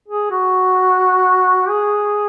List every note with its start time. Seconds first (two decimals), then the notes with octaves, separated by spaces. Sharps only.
0.08 G#4
0.31 F#4
1.68 G#4